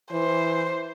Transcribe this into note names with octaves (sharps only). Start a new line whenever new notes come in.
E3 C5